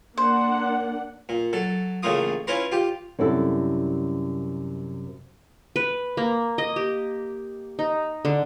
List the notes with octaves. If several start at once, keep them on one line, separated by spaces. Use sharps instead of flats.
A#3 D4 C5 F#5
A#2
F#3 A4
A1 C#3 A3 A#3 F4 D#6
C#4 E4 F4 B4 A#5 C6
F4 G4
F#2 C3 G3 E4 A4
B4
A#3
D#5
G4
D#4
D3